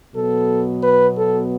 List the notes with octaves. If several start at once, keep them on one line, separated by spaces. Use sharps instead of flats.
B2 F#3 B3 A4
B4
A4